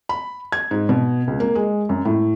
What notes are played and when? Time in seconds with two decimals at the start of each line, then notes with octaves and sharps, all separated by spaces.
0.09 B5
0.52 G#6
0.71 G#2
0.89 B2
1.27 C#2
1.40 A#3
1.55 G#3
1.89 F#2
2.05 A2